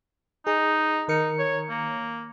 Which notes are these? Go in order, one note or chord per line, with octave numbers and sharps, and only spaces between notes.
D#4 G#4
D#3 D#4 A#4 C#7
C#5
A#3